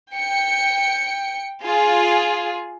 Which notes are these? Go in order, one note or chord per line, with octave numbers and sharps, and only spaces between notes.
G5 C#7
F4 G#4